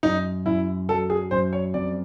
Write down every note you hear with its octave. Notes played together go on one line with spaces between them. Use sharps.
F#2 D#4
F#2 E4
F#3 A4
G#4
F#2 C5
C#5
F2 D5